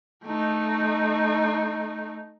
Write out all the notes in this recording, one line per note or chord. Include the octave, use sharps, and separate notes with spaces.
A3 D#4